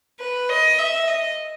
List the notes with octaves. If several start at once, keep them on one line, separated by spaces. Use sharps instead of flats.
B4
D#5
E5
D#5